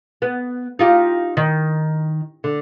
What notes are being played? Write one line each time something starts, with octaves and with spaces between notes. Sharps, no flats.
B3
D#4 F4 G4
D#3
D3